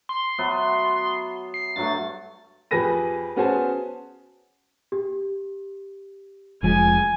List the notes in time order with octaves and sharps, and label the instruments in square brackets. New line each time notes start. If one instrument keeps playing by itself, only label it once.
[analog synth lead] C6
[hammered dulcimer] F#3 B3 E5
[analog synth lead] C7
[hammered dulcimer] G2 F#3 A3 [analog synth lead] A6
[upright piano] F2 G4 G#4 B4 A#6 D#7
B3 C#4 F#4 G#4 C5 A5
[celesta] G4
[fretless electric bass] F1 F3 G#3 [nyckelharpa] G#5